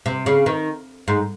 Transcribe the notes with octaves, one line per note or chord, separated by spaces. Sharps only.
C3
C#3
D#3
G#2